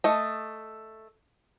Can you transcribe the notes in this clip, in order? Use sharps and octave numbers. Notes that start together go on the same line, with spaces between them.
A3 D#5